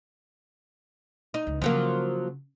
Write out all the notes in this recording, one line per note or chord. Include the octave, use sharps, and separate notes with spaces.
D#4
C#2
C#3 F3 F#3 A#3